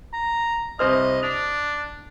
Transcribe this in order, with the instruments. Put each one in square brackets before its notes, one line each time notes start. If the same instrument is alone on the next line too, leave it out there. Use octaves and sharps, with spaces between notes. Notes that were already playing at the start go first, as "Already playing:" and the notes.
[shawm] A#5
[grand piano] C2 C5 F6 [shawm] D#5
[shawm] D4 [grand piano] F7